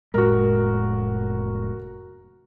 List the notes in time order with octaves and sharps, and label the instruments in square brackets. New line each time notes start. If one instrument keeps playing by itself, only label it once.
[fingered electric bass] F1 A2 G#3 [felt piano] F#4 A#4